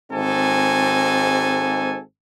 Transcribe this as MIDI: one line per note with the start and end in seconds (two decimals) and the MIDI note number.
0.12 2.00 32
0.12 2.00 44
0.12 2.00 60
0.12 2.00 69
0.12 2.00 80